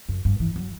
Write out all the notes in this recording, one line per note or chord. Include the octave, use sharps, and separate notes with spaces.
F#2
G2
E3
F#3